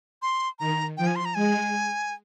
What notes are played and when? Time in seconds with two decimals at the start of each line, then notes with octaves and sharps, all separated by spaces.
0.22 C6
0.59 D#3 A#5
0.97 F3 G5
1.07 G#5
1.16 C6
1.25 A#5
1.35 G#3 G#5